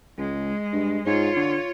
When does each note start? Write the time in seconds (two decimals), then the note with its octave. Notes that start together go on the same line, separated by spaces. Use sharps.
0.18 C#2 G#3
0.73 G2
1.06 G#2 F4 C#5
1.36 D3